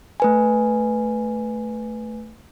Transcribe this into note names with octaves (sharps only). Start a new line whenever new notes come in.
A3 B4 G#5